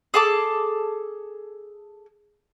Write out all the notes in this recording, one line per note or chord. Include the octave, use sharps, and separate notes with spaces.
G#4 A4 A5 D6